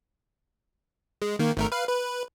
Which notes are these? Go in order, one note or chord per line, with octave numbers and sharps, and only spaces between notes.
G#3
D#3 A#3
G#1 A3 A#4
B4 F5
B4